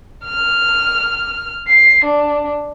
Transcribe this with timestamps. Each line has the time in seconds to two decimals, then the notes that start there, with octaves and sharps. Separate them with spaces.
0.25 F6
1.68 C7
2.05 D4